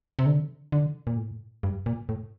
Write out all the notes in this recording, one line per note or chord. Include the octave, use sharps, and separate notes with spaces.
C3
D3
D3
A#2
A2
G2
A#2
A2